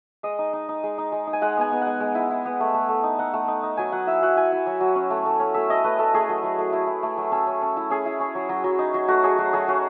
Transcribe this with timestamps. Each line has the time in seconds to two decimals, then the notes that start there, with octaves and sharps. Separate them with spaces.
0.23 G#3 D#5
0.39 D#4
0.53 D#4
0.69 D#4
0.83 G#3
0.98 D#4
1.12 G#3
1.27 D#4
1.33 G#5
1.42 G#3 F#5
1.57 B3 G#5
1.72 B3
1.82 G#3 F#5
2.00 G#3
2.15 E4
2.30 E4
2.46 B3
2.60 A3
2.74 A3
2.89 A3
3.04 D#4
3.19 D#4 F#5
3.34 A3
3.48 D#4
3.63 D#4
3.77 F#3 G#5
3.92 F#3 F#5
4.07 E4 E5
4.22 F#3 F#5
4.37 E4 G#5
4.52 E4
4.66 F#3
4.80 F#3
4.95 C#4
5.10 A3
5.26 A3
5.40 C#4
5.54 A3 E5
5.69 E4 D#5
5.84 A3 B4
5.98 A3 A4
6.14 A3 G#4
6.29 F#3
6.43 F#3
6.59 A3
6.73 E4
6.87 E4
7.03 A3
7.18 F#3
7.32 C#4 A4
7.47 C#4
7.62 C#4
7.77 E4
7.90 C#4 G#4
8.06 E4
8.20 C#4
8.35 F#3
8.49 F#3
8.64 F#3
8.79 D#4
8.94 F#3
9.08 A3 F#4
9.23 F#3 G#4
9.38 F#3 F#4
9.53 F#3 G#4
9.68 C#4 F#4